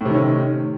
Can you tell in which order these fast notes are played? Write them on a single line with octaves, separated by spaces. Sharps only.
A2 C3 D#3 C#4